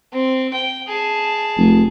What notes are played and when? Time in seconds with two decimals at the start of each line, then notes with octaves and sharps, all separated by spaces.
0.13 C4
0.53 G5
0.88 G#4 A5
1.58 F1